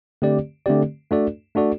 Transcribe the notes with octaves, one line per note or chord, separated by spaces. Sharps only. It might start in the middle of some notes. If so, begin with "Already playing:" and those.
D3 A3 C4 G4 D5
D3 A3 C4 G4 D5
A3 D4 F#4 A4 D5
A3 D4 F#4 A4 D5